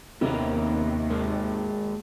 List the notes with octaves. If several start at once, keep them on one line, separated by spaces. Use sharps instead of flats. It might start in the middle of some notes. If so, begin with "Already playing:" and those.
D#2 C3 D#3 B3 C#4 A#4
G#2 G#3 A#4